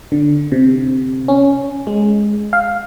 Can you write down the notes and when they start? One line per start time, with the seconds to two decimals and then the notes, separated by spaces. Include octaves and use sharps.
0.12 D3
0.52 C3
1.28 C#4
1.87 G#3
2.53 F5